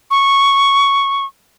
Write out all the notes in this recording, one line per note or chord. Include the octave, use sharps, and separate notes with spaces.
C#6